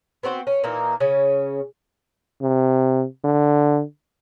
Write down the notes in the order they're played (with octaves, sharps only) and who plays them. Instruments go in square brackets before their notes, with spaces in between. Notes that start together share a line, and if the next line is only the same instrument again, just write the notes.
[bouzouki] B3 C4 F#4 C5
C#4
A#2 E3 A#3 D#4
C#3 C#4
[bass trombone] C3
D3